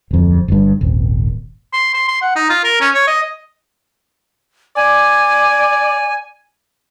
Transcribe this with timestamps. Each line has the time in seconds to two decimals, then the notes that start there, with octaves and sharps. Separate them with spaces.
0.11 D1 F2
0.48 G1 G2
0.81 D#1 G#1
1.73 C6
1.94 C6
2.08 C6
2.22 F#5
2.36 D#4
2.49 F4
2.64 A#4
2.81 C#4
2.95 C#5
3.07 D#5
4.76 D5 G#5